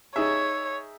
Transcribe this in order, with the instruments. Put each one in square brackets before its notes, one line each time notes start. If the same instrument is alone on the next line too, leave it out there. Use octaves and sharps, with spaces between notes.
[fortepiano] D#4 G#4 E5 [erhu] C#5